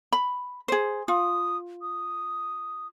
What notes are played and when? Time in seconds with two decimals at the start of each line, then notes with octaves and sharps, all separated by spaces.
0.13 B5
0.68 G#4 C5
1.08 F4 D#6
1.82 D#6